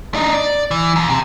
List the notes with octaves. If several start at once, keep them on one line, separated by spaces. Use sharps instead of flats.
D4 D#4
D5
E3
D#2
C3